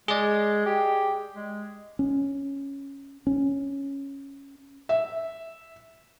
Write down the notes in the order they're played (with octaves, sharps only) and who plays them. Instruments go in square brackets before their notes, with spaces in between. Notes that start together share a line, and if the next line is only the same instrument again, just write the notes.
[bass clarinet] G#3 [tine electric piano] G#4 D5
[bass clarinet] G4
G#3
[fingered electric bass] C#4
C#4
[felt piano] E5